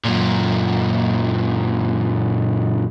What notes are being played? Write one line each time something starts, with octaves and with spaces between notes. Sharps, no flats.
F#2 A#2